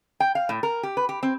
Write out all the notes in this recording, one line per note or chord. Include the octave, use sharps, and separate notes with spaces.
G5
F5
A2
A#4
G4
B4
G4
C4